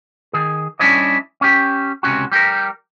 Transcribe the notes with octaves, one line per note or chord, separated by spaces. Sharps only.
D#3 G#4
G3 C#4 D4 E4 C#5 D#5
C#4 G4
C#2 C3 G3 C#4 F#4
G3 G4 A4 A#4